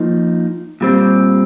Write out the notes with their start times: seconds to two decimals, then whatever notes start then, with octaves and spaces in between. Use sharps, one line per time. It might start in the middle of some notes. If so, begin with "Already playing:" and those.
Already playing: F3 A#3 D#4
0.81 A#2 G3 C4